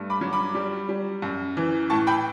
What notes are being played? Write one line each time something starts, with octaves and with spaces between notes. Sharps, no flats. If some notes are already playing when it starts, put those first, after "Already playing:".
Already playing: G2 A3
B5 D6
F#3
B5 D6
G3
G3
F#2
E3
A2 A5 C#6
G5 B5